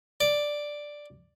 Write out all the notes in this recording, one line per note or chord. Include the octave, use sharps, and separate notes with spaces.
D5